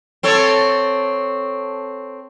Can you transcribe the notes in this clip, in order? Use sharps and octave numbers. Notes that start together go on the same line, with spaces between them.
C4 A4 C#5